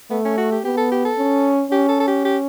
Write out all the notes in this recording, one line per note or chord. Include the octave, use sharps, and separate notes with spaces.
A3 B3
C#4
F#4
G4
B3 G4
A4
G4
A4
C#4
C#4 G4
A4
A4
G4
G4